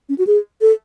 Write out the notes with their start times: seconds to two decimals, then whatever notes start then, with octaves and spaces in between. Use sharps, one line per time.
0.09 C#4
0.18 F#4
0.27 G#4
0.61 A4